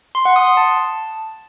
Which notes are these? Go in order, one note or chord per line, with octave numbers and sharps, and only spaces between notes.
C6
F#5
D#6
C6
A5